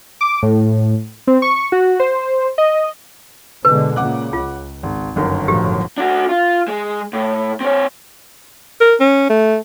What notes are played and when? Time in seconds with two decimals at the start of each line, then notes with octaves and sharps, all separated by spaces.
0.21 D6
0.43 A2
1.27 C4
1.42 C#6
1.72 F#4
2.00 C5
2.58 D#5
3.65 B2 D3 G#3 B4
3.96 A#2 C#3 F#5 D6 F#6
4.33 C#2 F4
4.83 G#1
5.16 G1 F#2 D#3
5.48 A2 F3 F#3 G4
5.98 D4 F#4
6.29 F4
6.68 G#3
7.13 A2
7.61 C4 C#5
8.81 A#4
9.00 C#4
9.29 A3